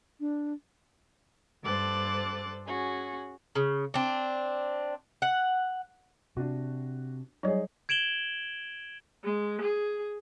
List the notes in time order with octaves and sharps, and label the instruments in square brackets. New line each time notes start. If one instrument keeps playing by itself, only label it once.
[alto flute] D4
[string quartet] G2 A4 C5 D6 F#6 A6
C#4 F#4 G#4
[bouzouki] C#3
C4 D4
F#5
[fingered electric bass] C3 [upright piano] D4 F#4
[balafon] F#3 G3 C#5 [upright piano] D#4 G#4
[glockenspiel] G#6 D7 E7 F#7 G7
[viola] G#3
G#4